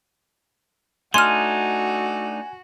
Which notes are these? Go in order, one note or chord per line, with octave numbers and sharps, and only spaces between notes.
A3 D4 D#4 F#4 G#5 C6 F6